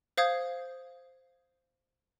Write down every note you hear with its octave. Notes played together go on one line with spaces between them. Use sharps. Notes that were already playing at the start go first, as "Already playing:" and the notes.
C5 F5 D#6 G#6